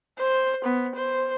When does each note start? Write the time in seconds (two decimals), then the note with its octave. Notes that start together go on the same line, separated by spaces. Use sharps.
0.19 C5
0.64 B3
0.95 C5